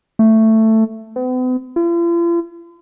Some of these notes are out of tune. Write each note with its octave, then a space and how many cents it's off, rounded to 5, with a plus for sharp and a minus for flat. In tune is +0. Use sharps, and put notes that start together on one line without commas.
A3 +10
B3 +45
F4 -45